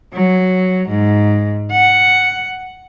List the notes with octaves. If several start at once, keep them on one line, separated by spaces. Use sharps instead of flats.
F#3
G#2
F#5